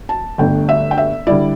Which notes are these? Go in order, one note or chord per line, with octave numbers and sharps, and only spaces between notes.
A5
G1 G2 D3 A3 D4 G5
E5
G5
E5
D3 G3 E4 D5